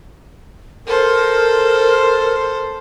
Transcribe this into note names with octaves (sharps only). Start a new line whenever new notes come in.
A4 A#4 C5